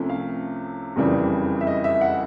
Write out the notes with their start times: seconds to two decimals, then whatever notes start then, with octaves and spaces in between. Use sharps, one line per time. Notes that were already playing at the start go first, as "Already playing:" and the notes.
Already playing: C2 C3 F3 A3 C#4
0.09 F5
0.96 F#1 F2 C#3 E3 G3
1.61 E5
1.67 D#5
1.84 E5
2.01 F#5